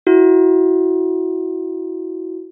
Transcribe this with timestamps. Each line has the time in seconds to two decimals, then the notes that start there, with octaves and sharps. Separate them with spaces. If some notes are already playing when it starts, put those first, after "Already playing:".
0.07 E4 F#4